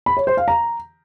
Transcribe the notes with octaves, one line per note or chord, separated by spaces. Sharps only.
B5
C#5
C5
F5
A#5